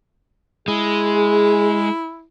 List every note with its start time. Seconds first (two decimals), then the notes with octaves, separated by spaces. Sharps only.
0.68 G#3 E4 G#4